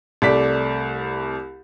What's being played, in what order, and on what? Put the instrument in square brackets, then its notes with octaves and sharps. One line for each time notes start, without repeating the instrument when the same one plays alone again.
[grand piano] C2 A3 D5 B6